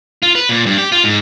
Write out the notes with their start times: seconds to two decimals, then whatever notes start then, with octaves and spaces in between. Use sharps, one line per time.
0.23 F4
0.35 B4
0.49 A#2
0.66 G2
0.78 G4
0.92 F4
1.04 G#2